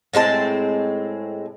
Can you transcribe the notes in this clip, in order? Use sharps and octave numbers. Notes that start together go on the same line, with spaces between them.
A2 G#3 C4 A5